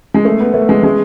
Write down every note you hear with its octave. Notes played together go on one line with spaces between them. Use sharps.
G#3
A3
B3
A3
G#3
G#3